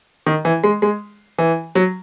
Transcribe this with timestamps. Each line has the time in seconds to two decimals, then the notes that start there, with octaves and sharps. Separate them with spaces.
0.26 D#3
0.45 E3
0.64 G#3
0.82 G#3
1.38 E3
1.75 F#3